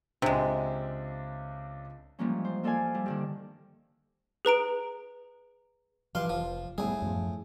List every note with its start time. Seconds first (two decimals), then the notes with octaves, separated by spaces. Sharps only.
0.22 C#2 C3 G#3 D4 E6
2.19 G#2 E3 F3 G3 A#3 C#4
2.45 C5
2.63 A#3 F4 A4 D5 F5 G#5
2.94 G3 E4
3.06 G2 D3 D#3
4.45 G#4 B4 A#5 D7
6.15 G2 E3 F3 F5 C6
6.29 F1 F3
6.78 A2 G3 A3 B3 G#4
7.02 F#2 F3